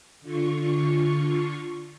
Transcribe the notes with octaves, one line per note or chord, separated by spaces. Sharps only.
D3 F4 C#6